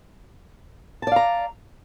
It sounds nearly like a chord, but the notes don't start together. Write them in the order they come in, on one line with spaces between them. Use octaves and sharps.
A5 D5 F5 A#5